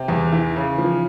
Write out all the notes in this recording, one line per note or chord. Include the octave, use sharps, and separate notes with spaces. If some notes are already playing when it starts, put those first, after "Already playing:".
Already playing: C3
E2
E3
C#3
F3